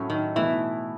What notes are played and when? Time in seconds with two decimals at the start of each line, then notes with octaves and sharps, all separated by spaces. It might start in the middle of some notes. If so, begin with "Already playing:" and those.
Already playing: A2 F#3 A3 C#4 F#4
0.10 D#3
0.36 B2 E3 A3 E4